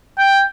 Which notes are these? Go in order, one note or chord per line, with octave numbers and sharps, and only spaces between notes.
G5